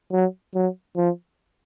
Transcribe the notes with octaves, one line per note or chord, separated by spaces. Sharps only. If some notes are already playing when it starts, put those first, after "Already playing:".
F#3
F#3
F3